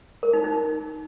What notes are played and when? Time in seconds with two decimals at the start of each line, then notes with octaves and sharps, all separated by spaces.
0.23 A#4
0.33 D#4
0.44 D#4